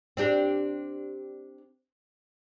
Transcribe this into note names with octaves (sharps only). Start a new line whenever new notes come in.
C4 D4 G4